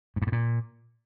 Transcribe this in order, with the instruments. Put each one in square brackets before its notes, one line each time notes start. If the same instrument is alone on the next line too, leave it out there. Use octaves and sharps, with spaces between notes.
[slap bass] G#2
G2
A2
A#2